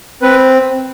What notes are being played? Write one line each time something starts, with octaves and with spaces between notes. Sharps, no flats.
C4 B4